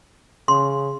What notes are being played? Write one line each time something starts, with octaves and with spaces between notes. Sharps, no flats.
C#3 C6